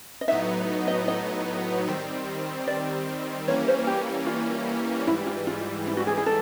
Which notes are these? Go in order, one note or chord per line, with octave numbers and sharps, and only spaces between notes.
D#5
A2 F#3 B3 D#4 E5
D#5
D#5
D#3 G3 C4
D5
E3 G3 A#3 C#4 C#5
C5
G4
F4
G#2 E3 G3 E4
F4
F4
E4
F#4
G#4
G#4
A4